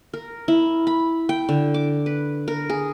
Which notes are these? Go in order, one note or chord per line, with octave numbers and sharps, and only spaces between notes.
A#4
E4
B5
G5
D3
D6
B4
A#4
G#4